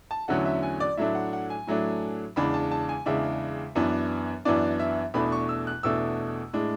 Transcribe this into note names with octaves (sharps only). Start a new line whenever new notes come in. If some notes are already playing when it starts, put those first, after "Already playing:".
A5
E2 D3 F#3 A3 C#4 F#5
E5
G#5
D5
A2 F#3 A3 D4 E5
F#5
F#5
G#5
A2 F#3 A3 D4
E2 C#3 G#3 D4 B5
A5
A5
G#5
E2 C#3 G#3 D4 E5
F#2 E3 B3 D4
F#2 E3 B3 D4 D5
E5
E2 B2 A3 D4 B5
C#6
E6
F#6
E2 B2 A3 D4 E6
A2 G#3 D4